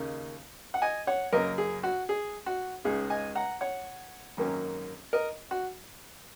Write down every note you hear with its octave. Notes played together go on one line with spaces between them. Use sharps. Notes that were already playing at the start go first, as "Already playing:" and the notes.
Already playing: D#2 C#3 A#3 D#4
F#5
D#5 G#5
C#5 F#5
F#2 C#3 A#3 A#4 D#5
G#4
F#4
G#4
F#4
C#2 C#3 G#3 D#4 G#4
D#5 G#5
F#5 A#5
C#5 F#5
G#1 F#2 D#3 A#3 C#4
A#4 D#5
F#4